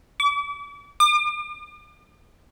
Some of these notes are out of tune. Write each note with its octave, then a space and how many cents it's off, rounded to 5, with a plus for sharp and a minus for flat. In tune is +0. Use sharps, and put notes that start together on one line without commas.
D6 -40
D6 +40